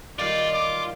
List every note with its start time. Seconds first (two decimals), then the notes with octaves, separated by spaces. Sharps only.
0.19 D#3 G3 D#4 F4 D5
0.53 D6